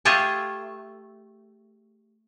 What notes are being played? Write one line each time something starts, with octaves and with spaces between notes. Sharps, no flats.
A3 F4 G4 G#4 A5